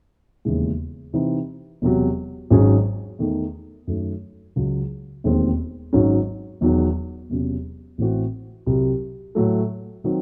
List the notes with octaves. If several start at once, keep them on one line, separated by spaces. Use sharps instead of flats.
E1 D#2 C#3 E3 G#3
C3 E3 C4 D#4
E1 E2 C3 F#3
G#1 G#2 F#3 C#4 G#4
E2 D#3 A3
F#2 D#3 A3
C#2 C#3 F#3
E1 D#2 D#3 G#3 C4
G#1 G#2 F#3 C#4
E1 E2 D#3 F#3
E1 E2 C3 F#3 C#4
A1 A2 E3 C4 F#4
C2 C3 F#3
A2 F#3 A3
D#3 F#3 C4